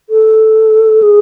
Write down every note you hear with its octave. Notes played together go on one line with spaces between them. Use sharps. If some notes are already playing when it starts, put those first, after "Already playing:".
A4
G#4